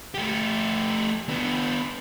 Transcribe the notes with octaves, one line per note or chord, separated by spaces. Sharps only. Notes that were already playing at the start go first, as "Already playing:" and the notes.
A3 G4
B3 D4